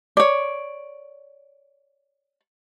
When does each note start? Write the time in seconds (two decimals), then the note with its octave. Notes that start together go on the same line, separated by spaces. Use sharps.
0.17 C#5 D5